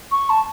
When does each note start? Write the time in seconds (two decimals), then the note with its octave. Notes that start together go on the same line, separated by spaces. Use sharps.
0.11 C#6
0.30 A5